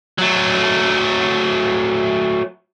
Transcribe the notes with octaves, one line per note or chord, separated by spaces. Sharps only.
F#3 A3